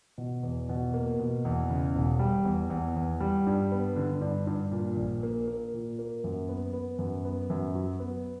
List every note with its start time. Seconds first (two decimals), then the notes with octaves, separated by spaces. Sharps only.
0.18 B2
0.43 E2
0.69 B2
0.94 A#3
1.19 B2
1.45 E2
1.70 C#3
1.95 E1
2.19 G3
2.45 E2
2.70 E2
2.96 E2
3.20 G3
3.47 G2
3.72 B3
3.96 D3
4.21 G2
4.47 G2
4.72 A#2
4.97 A#1
5.23 A#3
5.47 A#3
5.74 A#2
5.99 A#3
6.24 F#2
6.49 B3
6.73 B3
6.99 F#2
7.25 B3
7.50 F#2
7.75 F#3
8.00 B3